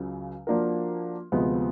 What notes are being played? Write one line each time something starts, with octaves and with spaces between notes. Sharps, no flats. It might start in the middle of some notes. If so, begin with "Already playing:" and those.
Already playing: C#2 C#3 F#3
F3 A#3 D4 F#4 A#4
D2 C3 F3 G#3 B3